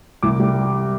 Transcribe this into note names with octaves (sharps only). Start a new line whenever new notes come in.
C2 D6
G3